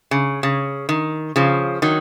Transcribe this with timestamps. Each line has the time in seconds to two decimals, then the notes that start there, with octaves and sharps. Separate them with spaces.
0.11 C#3
0.43 C#3
0.89 D#3
1.36 C#3 F3
1.82 D#3 F#3